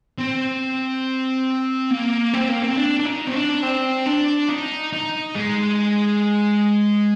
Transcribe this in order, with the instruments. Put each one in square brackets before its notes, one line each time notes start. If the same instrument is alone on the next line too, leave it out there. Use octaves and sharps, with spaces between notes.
[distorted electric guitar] C4
A#3
C4
A#3
C4
D4
D4
D#4
C4
D4
C4
D4
D#4
D#4
G#3